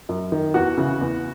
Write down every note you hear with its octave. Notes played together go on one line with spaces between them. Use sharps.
F#2
D#3
E2 F#4
C#3 E3
E2